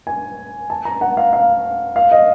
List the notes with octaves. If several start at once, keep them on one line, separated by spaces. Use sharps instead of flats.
G#5
A5
A#5
F#5
F5
F5
F5
D#5